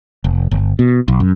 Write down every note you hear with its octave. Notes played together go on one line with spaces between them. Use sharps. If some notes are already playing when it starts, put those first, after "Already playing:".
F1
G1
B2
B1
F#2